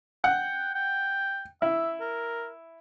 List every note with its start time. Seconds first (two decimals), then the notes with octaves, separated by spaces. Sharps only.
0.24 F#5 G5
0.75 G5
1.62 E4 E5
2.01 A#4